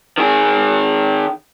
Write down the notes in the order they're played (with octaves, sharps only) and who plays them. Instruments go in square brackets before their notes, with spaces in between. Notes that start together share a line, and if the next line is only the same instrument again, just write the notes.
[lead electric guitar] D#3 G#4